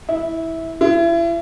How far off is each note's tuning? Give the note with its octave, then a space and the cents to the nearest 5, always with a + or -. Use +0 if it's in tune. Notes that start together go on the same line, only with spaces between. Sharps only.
E4 -15
E4 +35